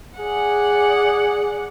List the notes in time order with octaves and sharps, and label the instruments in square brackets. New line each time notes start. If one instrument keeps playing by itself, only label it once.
[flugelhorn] G#4 [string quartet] D5 F#5